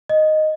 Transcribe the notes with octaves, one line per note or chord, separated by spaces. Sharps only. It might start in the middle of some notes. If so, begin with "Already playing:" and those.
D#5